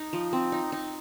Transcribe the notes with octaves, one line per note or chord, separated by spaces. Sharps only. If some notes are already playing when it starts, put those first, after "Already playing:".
Already playing: D#4
F3
C4
D#4
D#4